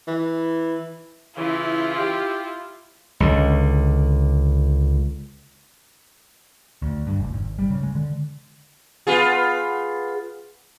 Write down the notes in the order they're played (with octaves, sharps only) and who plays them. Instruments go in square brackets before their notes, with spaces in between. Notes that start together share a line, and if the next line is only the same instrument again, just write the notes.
[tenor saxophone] E3
[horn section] C#3 E3 [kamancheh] E4 F4
[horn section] G4
[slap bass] C#2 D3
[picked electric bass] D2
G2
F1
G#1
G3
C#3
G#3
D3
[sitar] B3 F4 G#4